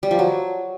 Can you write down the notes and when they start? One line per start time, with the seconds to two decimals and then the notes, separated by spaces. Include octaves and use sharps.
0.03 G3
0.11 F3
0.19 F#3